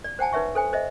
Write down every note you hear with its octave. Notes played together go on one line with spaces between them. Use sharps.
D5
C5 F#5 G#5 A5
D#4 B4 C#5 E5 C#6
A4 C5 G#5
C5 D#5 E5